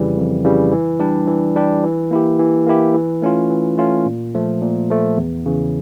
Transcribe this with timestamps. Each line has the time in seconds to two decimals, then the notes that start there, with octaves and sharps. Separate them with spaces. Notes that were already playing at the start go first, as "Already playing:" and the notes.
Already playing: F2 C#3 E3 G3
0.16 F2
0.44 C#3 E3 G3
0.72 E3
1.00 G3 D4 G4
1.28 E3
1.56 G3 D4 G4
1.84 E3
2.11 A#3 E4 G4
2.39 E3
2.66 A#3 E4 G4
2.95 E3
3.22 A3 C#4 F4
3.50 E3
3.78 A3 C#4 F4
4.06 A#2
4.35 F3 A3
4.61 A#2
4.90 F3 A3
5.17 E2
5.46 C#3 E3